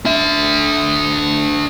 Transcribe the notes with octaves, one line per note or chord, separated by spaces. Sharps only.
D4 E5